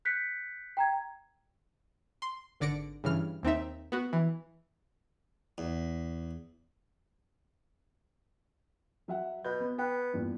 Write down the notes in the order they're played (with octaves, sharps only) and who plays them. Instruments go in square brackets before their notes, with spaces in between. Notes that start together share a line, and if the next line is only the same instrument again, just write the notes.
[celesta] F#6 G6 B6 C#7
G5 A#5 G#6
[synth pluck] C6
G#1 D3 D5 A#6 C#7 D7
G2 C#3 E3 F6
D#2 C4 D#4 E5
B3 F#4
E3
[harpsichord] E2
[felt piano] F#3 E5 F#5
[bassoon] B2 [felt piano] G6
[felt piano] B3
[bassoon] B3 [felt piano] G5
[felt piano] E2 G2 A#2